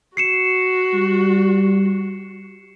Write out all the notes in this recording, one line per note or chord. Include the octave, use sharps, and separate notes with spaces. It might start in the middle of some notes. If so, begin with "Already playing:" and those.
F#4 C7 C#7 E7
G3